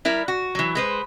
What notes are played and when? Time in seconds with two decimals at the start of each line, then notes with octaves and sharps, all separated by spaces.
0.05 G3 E4 A#4
0.28 F#4
0.55 E3 F#3
0.75 G#3 B4 C5